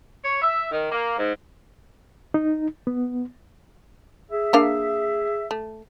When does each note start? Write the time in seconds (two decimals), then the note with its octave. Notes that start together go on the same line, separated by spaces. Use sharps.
0.25 C#5
0.42 E5
0.72 D#3
0.92 A#3
1.18 G#2
2.34 D#4
2.87 B3
4.31 G#4 E5
4.53 A#3 D4 F5
5.51 A3